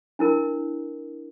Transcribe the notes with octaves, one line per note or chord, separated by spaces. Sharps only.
D4 E4 A#4